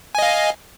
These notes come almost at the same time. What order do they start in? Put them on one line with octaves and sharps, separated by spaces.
G#5 D#5 F5